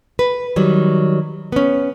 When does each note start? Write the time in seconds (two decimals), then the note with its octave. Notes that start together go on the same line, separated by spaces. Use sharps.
0.19 B4
0.56 D#3 F#3 G3
1.52 B3 C#4